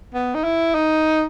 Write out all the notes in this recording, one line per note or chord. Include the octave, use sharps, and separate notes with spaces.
B3
D#4
E4
D#4